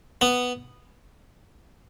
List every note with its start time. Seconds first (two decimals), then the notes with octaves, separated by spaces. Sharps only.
0.21 B3